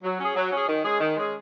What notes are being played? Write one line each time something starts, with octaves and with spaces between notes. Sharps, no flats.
F#3
C#4 G#4
F#3
C#4
G#4
D#3
G#3 C#4 G#4
D#3
G#3 C#4 G#4